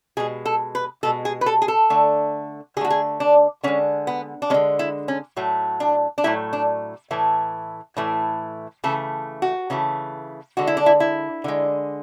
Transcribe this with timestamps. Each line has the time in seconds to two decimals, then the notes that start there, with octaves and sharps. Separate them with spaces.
0.17 B2 G#3 G#4
0.46 A4
0.75 B4
1.03 B2 G#3 A4
1.25 G#4
1.41 B4
1.46 A4
1.62 G#4
1.68 A4
1.90 D3 A3
2.76 D3 G#4
2.81 A3 F#4
2.90 G#4
3.20 D4
3.63 D3 G#3 C#4
4.07 B3
4.42 D4
4.50 G#3 C#4
4.54 D3
4.79 E4
5.08 C#4
5.36 A2 F#3 A3
5.80 D4
6.18 D4
6.24 A2 F#3 A3 E4
6.53 D4
7.11 A2 E3 A3
7.97 A2 E3 A3
8.84 C#3 E3 A3 A4
9.42 F#4
9.70 C#3 E3 A3
10.57 D3 G#3 F#4
10.67 E4
10.77 D4
10.86 E4
11.00 E4
11.44 D3 G#3